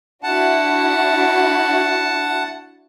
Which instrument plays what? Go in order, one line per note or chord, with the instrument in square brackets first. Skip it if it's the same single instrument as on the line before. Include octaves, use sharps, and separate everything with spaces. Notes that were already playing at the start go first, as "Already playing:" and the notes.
[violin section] D4 E4 F#4 [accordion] F#5 A5